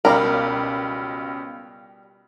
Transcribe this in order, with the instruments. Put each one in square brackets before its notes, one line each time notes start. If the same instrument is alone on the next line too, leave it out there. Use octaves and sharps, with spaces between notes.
[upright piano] C#2 B2 F5 [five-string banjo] G3 A#4